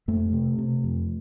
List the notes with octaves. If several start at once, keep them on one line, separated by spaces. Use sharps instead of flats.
F2 A3
C3
C3
F2